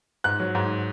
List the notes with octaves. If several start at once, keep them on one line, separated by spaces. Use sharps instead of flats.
G#2 F#6
F#3
G#2